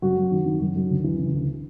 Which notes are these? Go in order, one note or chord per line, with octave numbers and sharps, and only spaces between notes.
F#2 F#4
F#2
D#3
D#3
F#2
F#2
D2
E3
C#3
D2